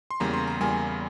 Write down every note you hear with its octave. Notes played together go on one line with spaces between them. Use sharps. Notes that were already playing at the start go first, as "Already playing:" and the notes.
C6
E2 C#3 G3 A#3 A#5
C6
A#5
E2 C#3 G3 A#3 G#5